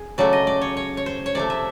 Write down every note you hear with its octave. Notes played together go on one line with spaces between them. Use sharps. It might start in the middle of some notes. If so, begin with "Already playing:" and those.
Already playing: G#4
C#3 F#3 A3 D5
D#5
D5
C#5
C#5
C#5
C5
C#5
C3 F3 A3 D5
E5